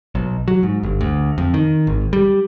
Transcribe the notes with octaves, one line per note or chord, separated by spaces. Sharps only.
B1
F#3
G#2
G1
D2
F2
D#3
G#1
G3